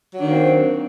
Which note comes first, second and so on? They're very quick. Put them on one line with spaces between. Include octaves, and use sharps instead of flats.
F#3 D4 D#3 A#3 C4